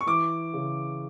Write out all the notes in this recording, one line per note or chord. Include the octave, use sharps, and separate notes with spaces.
C#6
E3 D6
C#3